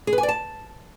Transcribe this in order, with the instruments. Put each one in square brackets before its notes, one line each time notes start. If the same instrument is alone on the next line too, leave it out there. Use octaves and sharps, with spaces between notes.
[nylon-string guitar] G#4
B4
G#5
D5
A5